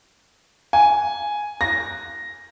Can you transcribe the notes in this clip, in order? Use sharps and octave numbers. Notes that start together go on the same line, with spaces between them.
G#5
A#6